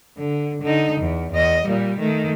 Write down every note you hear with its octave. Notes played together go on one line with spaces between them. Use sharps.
D3
D3 D#4
E2
E2 D#5
A#2 G3
D#3 A3